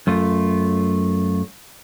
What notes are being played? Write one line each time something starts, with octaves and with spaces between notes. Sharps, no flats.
F#2 A3 F4